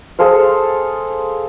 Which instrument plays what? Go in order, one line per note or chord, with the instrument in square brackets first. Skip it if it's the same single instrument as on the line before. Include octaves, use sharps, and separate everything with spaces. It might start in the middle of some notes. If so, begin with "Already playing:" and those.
[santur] G#4 A4 C5 F5